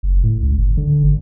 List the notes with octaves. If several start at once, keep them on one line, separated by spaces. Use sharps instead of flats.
F#1
A2
C#2
G1
D3
G#1